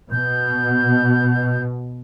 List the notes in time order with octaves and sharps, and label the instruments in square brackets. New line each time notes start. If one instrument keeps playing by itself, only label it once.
[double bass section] B2 [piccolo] G6